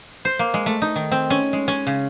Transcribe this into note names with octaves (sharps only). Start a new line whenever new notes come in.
C5
A#3
G#3
A3
D#4
D#3
C4
C#4
G#3
C#4
C#3